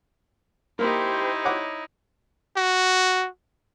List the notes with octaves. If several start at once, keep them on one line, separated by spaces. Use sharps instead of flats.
A#3 D#4 E4 G4 A#4 C5
C#5 F#5 D6
F#4